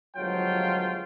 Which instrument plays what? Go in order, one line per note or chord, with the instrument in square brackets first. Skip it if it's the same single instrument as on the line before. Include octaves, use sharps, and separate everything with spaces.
[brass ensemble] G1 F3 F#3 G#3 F4 G5